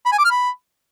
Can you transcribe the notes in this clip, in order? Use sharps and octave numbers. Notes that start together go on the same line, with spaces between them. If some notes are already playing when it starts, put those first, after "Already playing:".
B5
G#5
D6
F6
B5